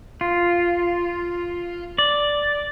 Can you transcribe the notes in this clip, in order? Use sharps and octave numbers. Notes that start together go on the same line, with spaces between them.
F4
D5